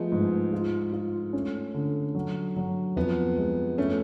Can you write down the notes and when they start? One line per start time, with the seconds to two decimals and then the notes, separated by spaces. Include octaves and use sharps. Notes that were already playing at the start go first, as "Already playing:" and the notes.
Already playing: F3 G#3 A3 B3
0.12 G#2
0.53 F4
0.93 F4
1.33 A3 C#4
1.74 D3
2.15 F#3
2.56 F#3
2.96 F2 B3
3.37 G#3
3.78 A3 C#4